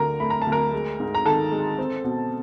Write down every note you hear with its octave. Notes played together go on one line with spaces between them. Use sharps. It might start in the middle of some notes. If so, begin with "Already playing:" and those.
Already playing: D2 D3 A#4 A#5
A3 B5
A#5
D2 A5
A#4 A#5
G#3
G#2
A#5
D#3 A4 A5
G#3
C4
B2